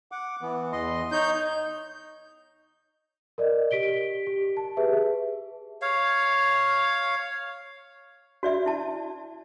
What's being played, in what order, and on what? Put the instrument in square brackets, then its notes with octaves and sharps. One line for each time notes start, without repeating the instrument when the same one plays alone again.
[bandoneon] F#5 D6
E3 B3
E2 D#5 C6
[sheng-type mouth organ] D#4 G6 [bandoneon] C#5
[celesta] A#4 D5 D#5
G4 B6 D7 G7
G4
A5
G4 G#4 B4 E5
[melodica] C#5 F5
[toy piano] F#4 D5 E5
E4 A5